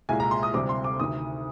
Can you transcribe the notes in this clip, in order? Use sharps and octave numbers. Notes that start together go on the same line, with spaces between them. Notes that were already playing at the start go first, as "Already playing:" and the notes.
C2 A#2 G#3 G#5
A#5
C6
D#6
D2 C3 G3 C4 D6
C6
D6
D2 C3 D#3 D#6